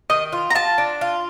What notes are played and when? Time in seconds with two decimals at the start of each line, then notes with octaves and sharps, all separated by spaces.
0.10 D#3 D#5
0.32 F4
0.50 A#5
0.55 F4 A5
0.78 D4
1.01 F4